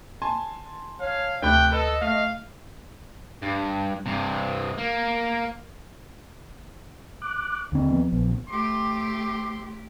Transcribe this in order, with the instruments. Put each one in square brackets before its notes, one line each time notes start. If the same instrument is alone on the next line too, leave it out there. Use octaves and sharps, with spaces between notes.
[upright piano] G#5 A5 C6
[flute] C#5 [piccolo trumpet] F5
[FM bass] D2 [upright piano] C3 A3 B5 [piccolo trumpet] G5 [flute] F#6
[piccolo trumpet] A4 [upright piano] B4 [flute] D#5
[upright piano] A3 [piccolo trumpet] F5
[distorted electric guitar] G2
G2 C3
A#3
[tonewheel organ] D6 F#6
[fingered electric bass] D#2 C4 [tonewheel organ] D3
[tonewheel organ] F3 B3
[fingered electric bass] A#1
[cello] A3 G4 [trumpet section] C4 C6 [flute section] D6